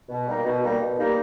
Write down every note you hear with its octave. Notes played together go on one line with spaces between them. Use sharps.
B2
G3 A#3 D#4
B2
G3 A#3 D#4
B2
G3 A#3 D#4